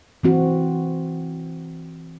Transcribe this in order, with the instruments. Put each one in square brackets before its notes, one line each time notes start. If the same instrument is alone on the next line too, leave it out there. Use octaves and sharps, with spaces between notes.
[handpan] E3 C4 F#4